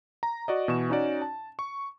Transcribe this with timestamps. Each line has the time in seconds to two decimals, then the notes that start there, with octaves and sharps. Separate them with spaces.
0.23 A#5
0.48 F#4 D5 D#5
0.68 B2 E3 C#6 E7
0.90 C#4 D#4 F#4 D5
1.22 A5
1.59 C#6